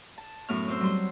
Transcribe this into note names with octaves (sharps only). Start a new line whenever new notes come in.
A5
F#2 A2 B3 C#6 F6
C4 C5 E6
F#3 G3 C6